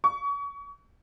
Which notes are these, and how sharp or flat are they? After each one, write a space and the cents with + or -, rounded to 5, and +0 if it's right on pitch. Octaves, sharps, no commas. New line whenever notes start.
C#6 +30